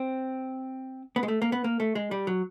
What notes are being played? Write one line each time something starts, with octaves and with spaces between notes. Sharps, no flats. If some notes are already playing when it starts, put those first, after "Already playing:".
Already playing: C4
B3
G#3
A3
A#3
B3
A#3
A3
G#3
G3
F#3